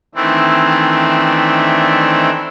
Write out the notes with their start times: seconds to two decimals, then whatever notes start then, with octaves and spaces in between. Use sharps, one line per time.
0.15 D#3 E3 A3 C4 D4 E4